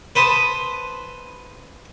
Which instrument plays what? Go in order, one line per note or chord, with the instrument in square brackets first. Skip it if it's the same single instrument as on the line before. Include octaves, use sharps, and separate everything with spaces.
[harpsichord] B4 C5 A5 D#6